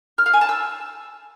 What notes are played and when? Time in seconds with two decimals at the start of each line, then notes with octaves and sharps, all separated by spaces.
0.18 F6
0.26 F5
0.34 G#5
0.41 A5
0.49 E6